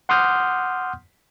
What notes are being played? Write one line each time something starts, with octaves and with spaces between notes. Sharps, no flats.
F#5 C6 D6 D#6 F6 G6